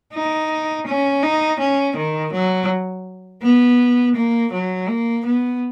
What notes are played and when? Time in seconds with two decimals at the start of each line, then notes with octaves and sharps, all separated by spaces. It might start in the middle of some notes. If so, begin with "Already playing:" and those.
0.13 D#4
0.87 C#4
1.23 D#4
1.60 C#4
1.96 D#3
2.33 F#3
3.42 B3
4.16 A#3
4.53 F#3
4.89 A#3
5.25 B3